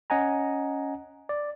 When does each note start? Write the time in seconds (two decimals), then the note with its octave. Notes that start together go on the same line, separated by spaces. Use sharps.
0.10 C#4 D#5 F#5 G#5 A#5
1.29 D5